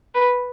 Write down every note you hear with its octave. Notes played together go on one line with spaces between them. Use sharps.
B4